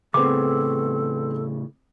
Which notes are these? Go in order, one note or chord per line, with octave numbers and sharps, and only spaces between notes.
A2 C#3 B3 C4 G#4 A4 D6